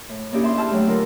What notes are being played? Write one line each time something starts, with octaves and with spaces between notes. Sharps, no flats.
A2
A#3 C#4 D4 E4 G4 G#4
E5 C6
E5 G5 A5 E6 F6
F#3 A3
D3 D4 E4 F4 A#4